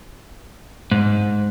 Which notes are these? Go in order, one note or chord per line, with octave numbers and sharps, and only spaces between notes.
G#2